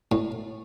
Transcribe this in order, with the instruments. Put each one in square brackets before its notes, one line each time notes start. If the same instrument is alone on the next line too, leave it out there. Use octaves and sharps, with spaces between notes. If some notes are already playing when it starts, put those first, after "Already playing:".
[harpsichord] A2